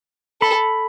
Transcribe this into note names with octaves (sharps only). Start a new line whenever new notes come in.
A4 B5